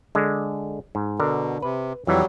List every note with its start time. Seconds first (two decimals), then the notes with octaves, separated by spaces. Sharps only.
0.15 D3 G#3
0.95 G#2
1.20 B2 D3 A#4
1.62 C3 B4
2.07 F2 E3 F#3 G3